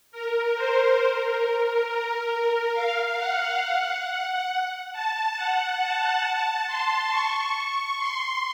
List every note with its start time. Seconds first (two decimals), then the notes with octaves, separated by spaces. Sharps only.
0.12 A#4
0.55 C5
0.98 A#4
1.87 A#4
2.73 F5
3.17 F#5
3.61 F#5
4.92 A5
5.36 F#5
5.80 A5
6.67 C6
7.10 C#6
7.98 C6